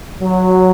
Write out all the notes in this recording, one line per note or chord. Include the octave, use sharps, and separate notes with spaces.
F#3